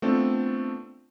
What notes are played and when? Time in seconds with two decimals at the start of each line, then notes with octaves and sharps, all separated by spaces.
0.02 A3 B3 C4 D4 F4 A4